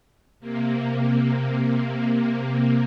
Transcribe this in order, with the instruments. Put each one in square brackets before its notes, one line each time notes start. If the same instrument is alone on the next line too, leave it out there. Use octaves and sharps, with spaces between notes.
[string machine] C3 A#3